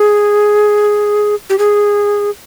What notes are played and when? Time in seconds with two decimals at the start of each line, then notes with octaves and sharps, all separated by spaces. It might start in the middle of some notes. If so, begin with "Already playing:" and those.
Already playing: G#4
1.50 G4
1.58 G#4